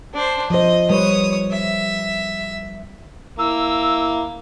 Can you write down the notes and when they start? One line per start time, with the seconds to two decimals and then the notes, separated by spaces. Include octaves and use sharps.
0.14 D4 C5
0.50 F3 C5 D#5
0.90 G3 B4 C#5 D#6
1.51 E5
3.39 A#3 E4 E6